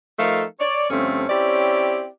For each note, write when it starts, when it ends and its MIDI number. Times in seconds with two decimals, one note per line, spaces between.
0.19 0.43 53
0.19 0.43 57
0.19 0.43 63
0.19 0.43 69
0.19 0.43 70
0.19 0.43 77
0.60 0.89 73
0.60 0.89 74
0.90 1.24 43
0.90 1.24 50
0.90 1.24 53
0.90 1.24 57
0.90 1.24 60
0.90 1.24 61
1.28 2.06 60
1.28 2.06 61
1.28 2.06 64
1.28 2.06 67
1.28 2.06 74